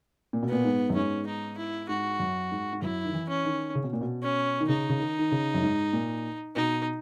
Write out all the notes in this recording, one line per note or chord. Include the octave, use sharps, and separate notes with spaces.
A#2
B2
A#2 B3
G#2
F#2
G#2 C#4
D#4
E4
G#2 F#4
F#2
G#2
G#2
F#2 E4
D#3
E3
C#4
D#3
C#3
B2
A#2
B2
C#4
D#3
C#3 D#4
C#3
D#3
D#3
C#3
F#2
G#2
A#2
B2 D#4